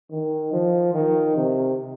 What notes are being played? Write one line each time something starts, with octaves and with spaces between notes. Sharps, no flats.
D#3
F3
D#3
C3